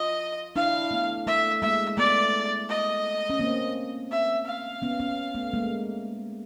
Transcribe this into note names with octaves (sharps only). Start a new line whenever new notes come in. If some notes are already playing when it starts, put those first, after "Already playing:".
Already playing: F4 D#5
D4 E4 F5
A3 B3
A3 E5
G#3 A#3 E5
A3 B3 D5
D#5
C#4
A#3 C4
E5
F5
B3 C#4
B3 C#4
A3 B3
G#3 A#3